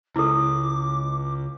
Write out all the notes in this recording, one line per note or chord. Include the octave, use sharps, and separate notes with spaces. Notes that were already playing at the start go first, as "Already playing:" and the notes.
C#2 E4 A4 D6